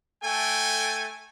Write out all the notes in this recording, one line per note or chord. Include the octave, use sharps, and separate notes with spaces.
A3 A4 G5 G#5